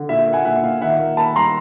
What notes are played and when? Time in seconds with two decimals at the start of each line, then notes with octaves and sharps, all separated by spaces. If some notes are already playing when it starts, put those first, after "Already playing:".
Already playing: D3
0.09 A#2 E5
0.27 A#3
0.33 F#5 G#5
0.45 A#2 E5 F#5
0.63 A#2 F5
0.81 D#3 E5 F#5
0.99 A#3
1.17 A#3 A5 B5
1.35 G3 A#5 C6